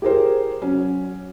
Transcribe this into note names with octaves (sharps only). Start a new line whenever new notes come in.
G4 G#4 A#4 C5
F#3 C#4